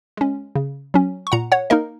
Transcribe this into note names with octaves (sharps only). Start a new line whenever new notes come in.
G#3 C#4
C#3
F#3 C#4
C#6
A#2 F#5 A#5
C#5 F#5
A#3 D#4 A#4 D#5